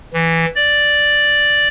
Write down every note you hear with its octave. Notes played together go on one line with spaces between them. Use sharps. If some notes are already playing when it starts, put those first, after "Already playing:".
E3
D5